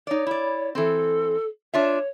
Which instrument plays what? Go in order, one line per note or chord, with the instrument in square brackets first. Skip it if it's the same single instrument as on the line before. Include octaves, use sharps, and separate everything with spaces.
[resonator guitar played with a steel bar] D#4 D5 [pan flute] C#5
[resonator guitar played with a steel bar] E4 D5
[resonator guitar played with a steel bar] E3 C4 [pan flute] A4
[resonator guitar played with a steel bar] D4 F4 E5 [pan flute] C#5